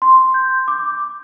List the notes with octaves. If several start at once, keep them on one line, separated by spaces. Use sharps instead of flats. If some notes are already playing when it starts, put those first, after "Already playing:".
C6
G6
D6